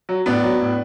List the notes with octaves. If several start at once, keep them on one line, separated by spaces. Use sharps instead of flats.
F#3
A2 B3 D4
F#3
A2